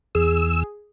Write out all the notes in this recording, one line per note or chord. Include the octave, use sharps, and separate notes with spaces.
E2 G#4 E6